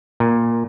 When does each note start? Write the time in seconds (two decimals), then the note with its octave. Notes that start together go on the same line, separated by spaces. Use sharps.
0.20 A#2